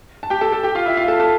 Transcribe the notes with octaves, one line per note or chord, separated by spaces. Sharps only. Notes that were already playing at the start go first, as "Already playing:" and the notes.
A5
G4 G5
A4 A5
A4 A5
G4 G5
F4 F5
E4 E5
F4 F5
A4 A5
A4 A5